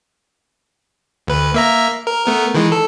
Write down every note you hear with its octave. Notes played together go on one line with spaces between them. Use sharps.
D2 B4
A#3 E5 A#5
A#4
A3 B3 A#4
D#3 E3 G#3
A4